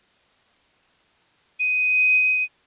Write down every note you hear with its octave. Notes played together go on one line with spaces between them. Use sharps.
D#7